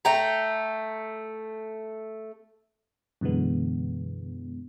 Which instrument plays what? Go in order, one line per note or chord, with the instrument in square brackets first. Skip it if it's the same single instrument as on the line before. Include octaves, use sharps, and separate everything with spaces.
[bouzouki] A3 G5 A#5
[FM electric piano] F#2 B2 D3 E3 G#3 B3